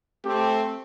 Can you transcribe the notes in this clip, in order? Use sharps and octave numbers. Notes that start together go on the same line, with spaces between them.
A3 C4 G4